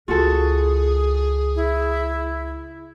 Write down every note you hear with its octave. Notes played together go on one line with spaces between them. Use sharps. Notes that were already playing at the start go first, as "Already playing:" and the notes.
C#2 F4 F#4 G#4 A4
E4